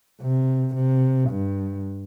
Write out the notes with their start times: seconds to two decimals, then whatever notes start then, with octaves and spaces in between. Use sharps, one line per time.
0.21 C3
0.75 C3
1.30 G2